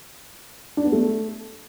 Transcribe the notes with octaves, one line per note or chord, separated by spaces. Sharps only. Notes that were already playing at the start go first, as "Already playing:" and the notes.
D4
B3
A3